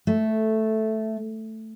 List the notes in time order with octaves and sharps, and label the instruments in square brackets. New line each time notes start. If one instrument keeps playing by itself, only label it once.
[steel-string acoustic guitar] A3